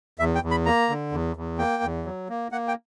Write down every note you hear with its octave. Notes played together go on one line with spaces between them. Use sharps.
E2 E5
G5
E2
B5
A#3 A#5
D3
E2
E2
A#3 G5
E2
F#3
A#3
A#3 F#5
G5